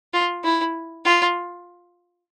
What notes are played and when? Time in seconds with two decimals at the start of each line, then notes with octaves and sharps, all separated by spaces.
0.13 F4
0.44 E4
1.05 F4